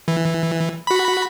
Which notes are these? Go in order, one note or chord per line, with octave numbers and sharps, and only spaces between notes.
E3
F#4 B5